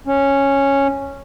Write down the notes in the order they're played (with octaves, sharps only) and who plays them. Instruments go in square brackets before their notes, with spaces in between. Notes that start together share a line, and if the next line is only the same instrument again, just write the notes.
[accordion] C#4